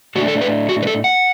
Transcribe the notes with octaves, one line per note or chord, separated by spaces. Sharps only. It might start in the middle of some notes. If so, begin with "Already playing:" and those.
A2 A3 D4 F#4
A4
B4
F#4
B4
A4
F#5